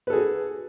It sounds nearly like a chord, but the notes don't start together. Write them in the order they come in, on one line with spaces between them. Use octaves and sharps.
B4 A4 G#4 F#4